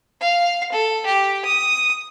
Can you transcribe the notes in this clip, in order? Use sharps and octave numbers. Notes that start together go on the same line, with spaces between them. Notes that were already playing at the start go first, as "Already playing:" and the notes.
F5
A4
G4
D#6